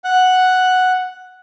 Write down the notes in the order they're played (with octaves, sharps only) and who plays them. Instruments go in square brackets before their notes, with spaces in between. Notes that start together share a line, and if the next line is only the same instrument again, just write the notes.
[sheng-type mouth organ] F#5 F#6